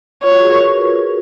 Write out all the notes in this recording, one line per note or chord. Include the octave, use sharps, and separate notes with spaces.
F4 C#5
F#4
G#4
A#4
B4